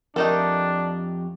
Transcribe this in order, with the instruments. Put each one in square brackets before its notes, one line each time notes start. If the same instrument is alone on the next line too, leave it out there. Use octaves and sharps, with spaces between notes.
[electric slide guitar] F2 G4 [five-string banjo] A3 D#4 A4 [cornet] D4 [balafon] A#4